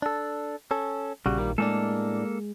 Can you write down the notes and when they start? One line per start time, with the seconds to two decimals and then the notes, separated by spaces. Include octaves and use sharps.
0.02 D4 A4
0.71 C#4 A4
1.26 A#1 C#3 G3 F#4
1.38 D#3 A#3
1.58 A2 G#3 A#3 D4 A4